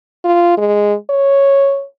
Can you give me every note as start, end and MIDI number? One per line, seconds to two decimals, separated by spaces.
0.25 0.57 65
0.58 0.94 56
1.10 1.84 73